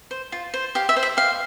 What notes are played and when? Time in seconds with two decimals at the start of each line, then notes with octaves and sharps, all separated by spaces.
0.11 C5
0.32 F4
0.54 C5
0.75 G4 F5
0.89 E5
0.96 C5
1.03 E5
1.17 G4 F5